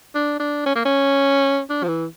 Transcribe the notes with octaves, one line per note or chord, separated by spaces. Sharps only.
D4
D4
C#4
A#3
C#4
D4
F3
E3